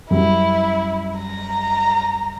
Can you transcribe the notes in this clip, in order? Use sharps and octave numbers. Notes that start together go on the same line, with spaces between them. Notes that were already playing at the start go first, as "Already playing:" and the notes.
F#2 G3 E4
A#5